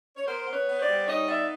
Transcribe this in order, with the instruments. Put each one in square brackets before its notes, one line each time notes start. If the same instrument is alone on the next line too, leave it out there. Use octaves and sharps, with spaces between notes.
[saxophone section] C#5
B3 A#4 C5
B3
B4 C#5
B3
C5 D5
G3
D#4 C#5 D#5
B3 D5 E5